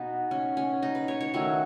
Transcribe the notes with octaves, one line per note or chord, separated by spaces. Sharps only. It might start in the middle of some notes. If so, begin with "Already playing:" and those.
Already playing: B2 B3 D#4
C#4
C#4
D#4
B4
C#5
C#5
D#3 F#3 A3 C#5